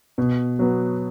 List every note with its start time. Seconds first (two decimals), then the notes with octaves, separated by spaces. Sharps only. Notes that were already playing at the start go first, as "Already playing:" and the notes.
0.18 B2
0.59 F#3 B3